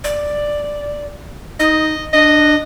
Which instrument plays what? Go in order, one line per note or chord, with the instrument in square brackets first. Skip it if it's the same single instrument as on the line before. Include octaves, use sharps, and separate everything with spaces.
[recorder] D5
[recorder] D#4 [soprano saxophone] D#5
[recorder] D4 [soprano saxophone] D#5